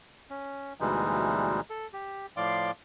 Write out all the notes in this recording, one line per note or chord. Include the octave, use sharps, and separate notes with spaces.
C#4
D2 B2 E3 G3 G#3 D#4
A4
G4
A2 F3 D5 F5 C6 D6